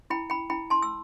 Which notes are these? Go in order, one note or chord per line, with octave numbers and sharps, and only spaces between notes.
E4 G5 B5
G5 B5
E4 G5 B5
A5 C6
E6